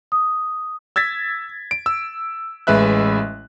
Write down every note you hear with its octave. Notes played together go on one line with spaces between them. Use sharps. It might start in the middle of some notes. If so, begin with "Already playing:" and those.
D#6
E6 G#6 A6 B6
D7
E6
A1 G#3 B4 E5 F#6